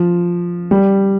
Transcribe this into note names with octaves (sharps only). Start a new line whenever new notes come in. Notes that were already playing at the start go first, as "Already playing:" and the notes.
Already playing: F3
G3